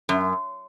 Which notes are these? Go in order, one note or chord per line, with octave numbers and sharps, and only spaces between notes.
F#2